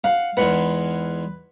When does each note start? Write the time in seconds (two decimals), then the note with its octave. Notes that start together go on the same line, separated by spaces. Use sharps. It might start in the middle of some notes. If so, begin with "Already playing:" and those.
0.04 F5 F#5
0.37 E2 G#2 B4 F#5